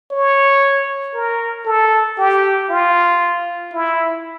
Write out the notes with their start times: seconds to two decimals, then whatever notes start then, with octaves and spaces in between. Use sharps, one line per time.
0.11 C#5
1.14 A#4
1.65 A4
2.18 G4
2.70 F4
3.73 E4